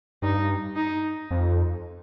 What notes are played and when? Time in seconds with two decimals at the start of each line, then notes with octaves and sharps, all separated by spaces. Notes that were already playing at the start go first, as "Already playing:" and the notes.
0.22 G2 D#4
0.76 D#4
1.31 F2